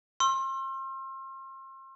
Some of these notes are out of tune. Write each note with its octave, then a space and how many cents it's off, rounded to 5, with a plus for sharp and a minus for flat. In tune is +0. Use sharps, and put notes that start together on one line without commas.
C6 +35 E6 +40